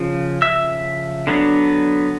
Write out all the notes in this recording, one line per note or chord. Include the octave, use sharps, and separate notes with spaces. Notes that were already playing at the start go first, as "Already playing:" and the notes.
Already playing: C#3 F3
E5 E6
D3 F#3 B3 D4